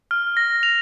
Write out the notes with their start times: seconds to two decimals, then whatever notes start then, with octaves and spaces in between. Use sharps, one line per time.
0.11 F6
0.37 A#6
0.63 F7